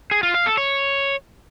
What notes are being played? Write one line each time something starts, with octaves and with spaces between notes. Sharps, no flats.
G#4
F4
F5
A4
C#5